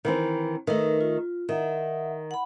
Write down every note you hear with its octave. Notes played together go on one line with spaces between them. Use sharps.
D#3 E3 C4
D#3 A3 D#4 A#4 B4
F4
D#3 E5 F#5
F#5 B5